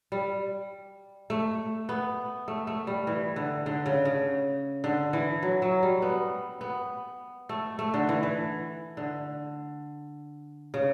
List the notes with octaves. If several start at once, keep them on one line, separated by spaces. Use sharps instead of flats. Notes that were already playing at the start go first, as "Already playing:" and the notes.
G3
A3
B3
A3
A3
G3
E3
D3
D3
C#3
C#3
D3
E3
F#3
F#3
G3
B3
B3
A3
A3
D3
E3
E3
D3
C#3